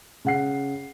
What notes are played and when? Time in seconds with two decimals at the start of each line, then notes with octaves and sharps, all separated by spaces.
0.25 C#3 F#5 C7